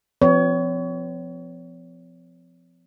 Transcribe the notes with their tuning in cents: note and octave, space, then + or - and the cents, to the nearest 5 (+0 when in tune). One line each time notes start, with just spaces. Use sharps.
F3 +0 C4 -40 C#5 +30